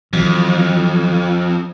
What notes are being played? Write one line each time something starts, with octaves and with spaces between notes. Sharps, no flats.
F2 D#3 E3 F#3